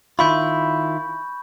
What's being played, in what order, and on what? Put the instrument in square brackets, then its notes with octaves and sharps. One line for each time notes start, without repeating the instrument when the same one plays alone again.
[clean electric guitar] D#3 E4 F4 [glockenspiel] B5 C#6 G6